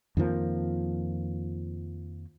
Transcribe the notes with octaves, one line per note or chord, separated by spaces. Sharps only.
F2 D#3 F3 A#3